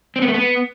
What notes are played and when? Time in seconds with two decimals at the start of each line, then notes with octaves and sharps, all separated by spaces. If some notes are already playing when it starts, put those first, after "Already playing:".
0.16 C4
0.22 B3
0.28 A3
0.34 B3